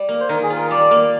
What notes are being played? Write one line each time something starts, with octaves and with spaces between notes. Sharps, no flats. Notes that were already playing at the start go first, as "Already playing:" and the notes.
Already playing: G3
A#3
C5
D#3 A#4
G#4
F4
A#4
G3 D5
A#3